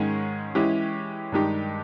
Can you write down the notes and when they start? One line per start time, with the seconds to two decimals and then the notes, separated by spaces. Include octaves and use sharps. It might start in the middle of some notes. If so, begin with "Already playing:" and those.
Already playing: G#2 D#3 G#3 C#4 G#4
0.55 E3 G#3 C#4 E4 G4
1.32 G2 D#3 G#3 D#4 G4